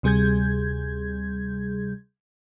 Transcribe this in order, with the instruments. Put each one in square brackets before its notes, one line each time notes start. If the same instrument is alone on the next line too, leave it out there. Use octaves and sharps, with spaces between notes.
[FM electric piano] D2 C3 G3 G#4 G6 G#6